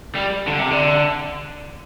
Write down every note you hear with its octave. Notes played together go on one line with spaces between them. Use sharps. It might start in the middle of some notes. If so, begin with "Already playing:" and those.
G3
D3
C3
D3